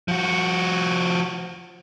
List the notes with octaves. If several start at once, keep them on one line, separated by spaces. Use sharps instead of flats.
F3 F#4